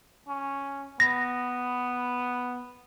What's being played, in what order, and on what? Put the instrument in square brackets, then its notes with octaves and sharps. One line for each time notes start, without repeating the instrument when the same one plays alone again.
[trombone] C#4
[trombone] B3 [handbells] A#6